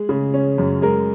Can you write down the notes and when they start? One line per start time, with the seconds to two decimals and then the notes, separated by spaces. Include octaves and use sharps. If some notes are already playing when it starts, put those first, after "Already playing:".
Already playing: G#3 G#4
0.09 C#3
0.34 C#4
0.58 F#2
0.82 G#3 A#4